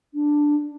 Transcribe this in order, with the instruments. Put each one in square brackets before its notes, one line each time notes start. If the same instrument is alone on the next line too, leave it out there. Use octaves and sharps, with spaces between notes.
[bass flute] D4